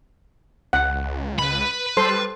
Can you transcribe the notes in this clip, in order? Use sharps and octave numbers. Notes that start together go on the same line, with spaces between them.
C#2 F#5
B4 B5
G3 A4 C5 C6